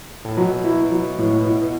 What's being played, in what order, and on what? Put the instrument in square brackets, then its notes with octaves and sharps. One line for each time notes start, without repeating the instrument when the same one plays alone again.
[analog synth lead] A2
[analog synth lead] B2 [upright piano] F#3
[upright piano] E4
F#3
A2
E4